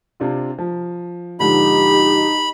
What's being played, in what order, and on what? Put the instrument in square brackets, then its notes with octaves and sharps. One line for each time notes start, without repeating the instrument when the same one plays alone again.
[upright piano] C3 D4 F4
F3
[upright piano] G#2 D3 F3 [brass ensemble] D#4 [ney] G4 [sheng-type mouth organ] B5